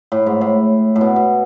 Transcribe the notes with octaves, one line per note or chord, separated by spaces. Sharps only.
A2
G#2
A2
A2
B2
B2